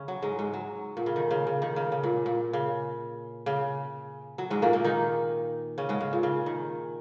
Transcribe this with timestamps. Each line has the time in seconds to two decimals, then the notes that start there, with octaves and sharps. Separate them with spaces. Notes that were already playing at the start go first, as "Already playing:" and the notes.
Already playing: C#3 C#4
0.08 F#3
0.22 G#2 G#3
0.39 G#2 G#3
0.54 F#3
0.97 A#2
1.06 C#3
1.16 D#3
1.31 C#3
1.47 C#3
1.62 D#3
1.76 C#3
1.92 C#3
2.03 A#2
2.26 A#2
2.53 C#3
3.46 C#3
4.38 F#3
4.50 G#2 G#3
4.62 A#2 A#3
4.73 A#2 A#3
4.84 D#3 D#4
5.78 C#3 C#4
5.89 G#2 G#3
6.01 C#3
6.13 A#2
6.23 C#3
6.46 D#3